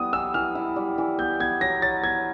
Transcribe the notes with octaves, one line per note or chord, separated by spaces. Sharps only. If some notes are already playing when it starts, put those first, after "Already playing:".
Already playing: G3 B3 E4 D#6
E3 E6
E3 F6
E4
G3
E3
B3 G6
B3 G#6
F#3 A#6
F#3 A6
B3 G#6